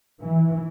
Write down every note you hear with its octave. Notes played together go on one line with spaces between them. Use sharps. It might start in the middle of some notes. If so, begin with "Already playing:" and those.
E3